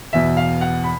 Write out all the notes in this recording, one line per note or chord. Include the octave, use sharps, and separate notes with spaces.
E2 B2 E5
F5
F#5
B5